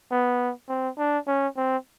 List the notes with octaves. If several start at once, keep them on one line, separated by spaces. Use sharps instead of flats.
B3
C4
D4
C#4
C4